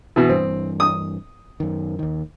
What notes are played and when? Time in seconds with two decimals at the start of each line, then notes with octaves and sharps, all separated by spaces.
0.16 B2 E3
0.29 G2 E3 C4
0.80 D#6
1.60 F#2 D#3
1.99 D#2 D#3